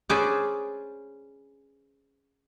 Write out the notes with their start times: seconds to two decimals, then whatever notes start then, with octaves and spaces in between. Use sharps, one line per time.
0.10 C#4 G#4 B4 C5 D5